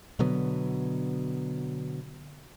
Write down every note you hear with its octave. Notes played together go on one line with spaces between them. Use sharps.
B2 D3 F#3 B3